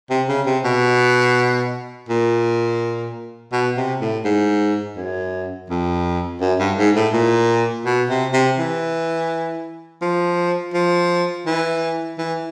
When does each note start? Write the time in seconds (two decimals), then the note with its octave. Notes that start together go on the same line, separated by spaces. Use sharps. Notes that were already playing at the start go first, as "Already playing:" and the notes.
0.10 C3
0.29 C#3
0.46 C3
0.65 B2
2.09 A#2
3.52 B2
3.77 C3
4.01 A2
4.25 G#2
4.97 F#2
5.70 F2
6.41 F#2
6.60 G2
6.78 G#2
6.95 A2
7.13 A#2
7.86 B2
8.10 C3
8.33 C3
8.58 E3
10.02 F3
10.74 F3
11.46 E3
12.18 E3